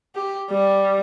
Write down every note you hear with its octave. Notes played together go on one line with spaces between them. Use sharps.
G4
G3